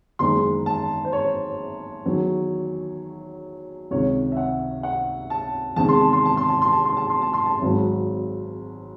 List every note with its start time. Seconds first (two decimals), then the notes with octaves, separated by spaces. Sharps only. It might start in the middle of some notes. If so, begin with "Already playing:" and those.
0.19 F#1 E2 D#3 G#3 C6
0.66 A5
1.05 C5
1.13 C#5
2.05 E2 D#3 F#3
3.91 C#2 C3 D#3 C#5
4.32 E5
4.37 F#5
4.83 F#5
5.30 A5
5.76 E2 C3 D#3 G#3 A5
5.89 C6
6.01 A5
6.13 C6
6.25 A5
6.37 C6
6.49 A5
6.62 C6
6.73 A5
6.85 C6
6.97 A5
7.10 C6
7.22 A5
7.34 C6
7.46 A5
7.62 G#1 G#2 F#3